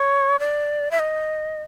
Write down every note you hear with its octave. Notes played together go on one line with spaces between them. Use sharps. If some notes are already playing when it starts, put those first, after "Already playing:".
Already playing: C#5
D5
E5
D#5